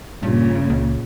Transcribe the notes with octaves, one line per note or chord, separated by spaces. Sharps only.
G2 A#2 C#3
C#2